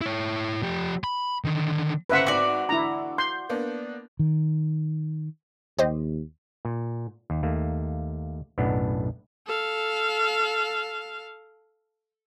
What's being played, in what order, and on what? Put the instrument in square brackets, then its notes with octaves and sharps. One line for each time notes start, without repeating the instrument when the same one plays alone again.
[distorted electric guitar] E4 C#5
F3 G4
B5
D3 D#3
[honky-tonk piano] G1 C#3 C5 [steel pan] B4 E5 F#5
[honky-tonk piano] G#2 C4 [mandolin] F#4 D5
[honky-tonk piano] D3 [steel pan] E4 A#5
[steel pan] C6 [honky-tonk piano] G6
[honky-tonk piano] A#3 B3 D4
[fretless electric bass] D#3
[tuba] D#2 [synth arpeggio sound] G4 C5 D#5
[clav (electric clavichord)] A#2
D#2
D#2 A3 A#3
B1 F#2 A2 B3 D4
[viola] A4 F5